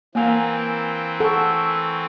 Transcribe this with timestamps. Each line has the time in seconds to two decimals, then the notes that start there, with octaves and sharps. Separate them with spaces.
0.15 E3 A#3 C4 A#4 F5 G#5
1.20 A4 F#5 C#6